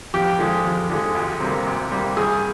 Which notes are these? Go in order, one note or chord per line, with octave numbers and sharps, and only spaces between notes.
F2 G4
D3 F3 G#3
F2
D3 F3 G#3
D2
C3 G3 A#3
D2
C3 G3 A#3
G2 G#4